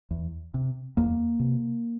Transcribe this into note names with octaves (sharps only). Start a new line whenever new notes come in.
E2
C3
E2 A#3
C3